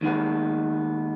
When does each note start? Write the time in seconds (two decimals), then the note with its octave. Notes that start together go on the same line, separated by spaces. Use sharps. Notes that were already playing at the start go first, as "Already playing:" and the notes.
0.01 D#2 D#3 G#3 B3